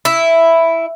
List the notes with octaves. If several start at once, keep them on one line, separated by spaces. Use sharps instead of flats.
E4